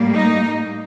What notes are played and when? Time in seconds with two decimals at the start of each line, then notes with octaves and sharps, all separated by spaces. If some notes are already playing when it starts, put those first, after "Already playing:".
Already playing: A2 G3 A#3
0.14 D#4